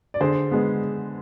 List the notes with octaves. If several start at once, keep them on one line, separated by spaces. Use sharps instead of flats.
D5
D3 G#4 C5
G#3 B3